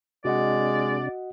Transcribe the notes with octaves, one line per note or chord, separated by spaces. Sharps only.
C3 G#3 D4 F#4 D5 D#5 F#5